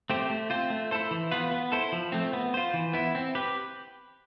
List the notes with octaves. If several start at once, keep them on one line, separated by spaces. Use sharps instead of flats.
A3 C4 G4 C5
A3
C4 F4 C5
A3
E4 A4 C5
E3
B3 F4 B4
B3
E4 A4 C5
F3
A3 C4
B3
F4 C5
E3
B3 E4
C4
G4 B4